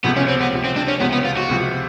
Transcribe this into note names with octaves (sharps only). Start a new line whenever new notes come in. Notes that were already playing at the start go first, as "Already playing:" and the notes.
C#2 C3 F3 B3
C#4
C4
B3
C#2 C3 F3
C4
D4
C#4
C#2 C3 F3 B3
B3
F4
F#4
C#2 C3 F3